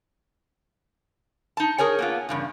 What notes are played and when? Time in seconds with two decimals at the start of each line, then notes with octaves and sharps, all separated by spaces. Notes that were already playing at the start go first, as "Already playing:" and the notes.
1.57 D#4 A5
1.78 G#4 A#4 C#5 G#5
1.99 A#3 B3 F4
2.29 E2 G2 C#3